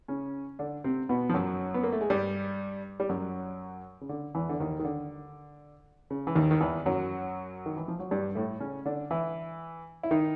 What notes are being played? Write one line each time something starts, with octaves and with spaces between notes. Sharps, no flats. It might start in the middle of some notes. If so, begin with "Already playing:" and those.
C#3 C#4
D3 D4
C3 C4
B2 B3
F3
F#2 F#3
B3
A#3
A3
G#3
G2 G3
G3
F#2 F#3
C#3
D3
E2 E3
D3
D#2 D#3
D#3
D3
C#3
E3
D#2 D#3
D#3
E2 E3
F#2 F#3
D#3
E3
F3
F#3
G2 G3
A2 A3
C#3 C#4
D3 D4
E3 E4
E4
D#3 D#4